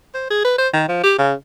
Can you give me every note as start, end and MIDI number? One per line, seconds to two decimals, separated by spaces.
0.14 0.29 72
0.30 0.44 68
0.44 0.54 71
0.58 0.68 72
0.73 0.85 51
0.88 0.99 53
1.03 1.14 67
1.18 1.33 49